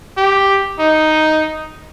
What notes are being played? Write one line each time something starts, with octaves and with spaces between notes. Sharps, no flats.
G4
D#4